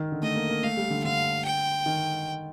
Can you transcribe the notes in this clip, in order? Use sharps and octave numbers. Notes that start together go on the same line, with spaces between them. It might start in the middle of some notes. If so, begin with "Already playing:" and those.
Already playing: D#3
D3
A3 D#5
A#3
A#3
A3 F5
G3
D3
D3 F5
G5
D#3